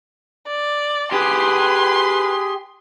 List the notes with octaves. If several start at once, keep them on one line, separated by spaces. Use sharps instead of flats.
D5
G4 G#4 B4 C6